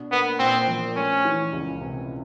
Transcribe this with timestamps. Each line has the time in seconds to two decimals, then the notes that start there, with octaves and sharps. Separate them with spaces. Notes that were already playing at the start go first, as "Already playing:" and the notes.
Already playing: B2 D4
0.12 A#3 B3
0.39 A#2 C4
0.67 F3
0.96 A3 C#4
1.25 E3
1.53 C#2
1.81 C3